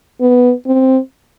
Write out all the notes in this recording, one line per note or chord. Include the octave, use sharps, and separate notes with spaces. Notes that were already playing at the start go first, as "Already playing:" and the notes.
B3
C4